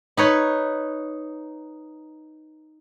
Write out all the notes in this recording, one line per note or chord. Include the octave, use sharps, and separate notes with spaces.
D#4 B4 C#5